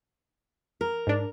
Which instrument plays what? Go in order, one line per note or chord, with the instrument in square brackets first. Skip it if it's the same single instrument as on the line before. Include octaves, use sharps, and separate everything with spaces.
[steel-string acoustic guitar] A#4
[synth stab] G#2 D4